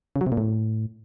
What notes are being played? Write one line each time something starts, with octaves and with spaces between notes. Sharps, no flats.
C#3
F#3
C3
A#2
A2